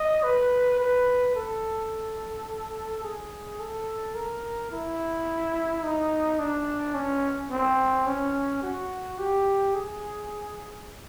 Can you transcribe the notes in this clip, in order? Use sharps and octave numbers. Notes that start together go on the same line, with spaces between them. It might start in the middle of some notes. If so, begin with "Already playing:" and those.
Already playing: D#5
B4
B4
A4
G#4
A4
A#4
E4
D#4
D4
C#4
C4
C#4
F#4
G4
G#4